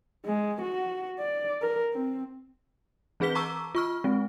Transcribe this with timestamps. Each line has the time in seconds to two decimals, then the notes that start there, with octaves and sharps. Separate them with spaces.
0.25 G#3
0.61 F#4
1.19 D5
1.62 A#4
1.93 C4
3.20 E3 C4 G#4 B4 B6 G7
3.35 A5 A#5 C#6 D6 E6
3.75 F4 C#6 F6
4.04 G#3 C4